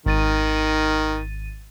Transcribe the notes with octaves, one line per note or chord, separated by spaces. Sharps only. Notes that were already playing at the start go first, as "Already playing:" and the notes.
G#1 D#3 A6 D#7